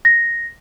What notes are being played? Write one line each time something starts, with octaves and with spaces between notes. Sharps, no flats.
A#6